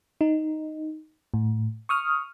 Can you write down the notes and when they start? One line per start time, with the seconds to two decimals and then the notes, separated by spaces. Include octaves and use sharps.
0.21 D#4
1.34 A2
1.89 C#6 D#6 F6